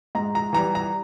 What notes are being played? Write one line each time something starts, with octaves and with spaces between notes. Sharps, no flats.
G#2 A#5
A#5
E3 G3 A#5
A#5